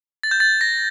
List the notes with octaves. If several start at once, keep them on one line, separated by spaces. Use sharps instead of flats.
A6
G6
A6
A#6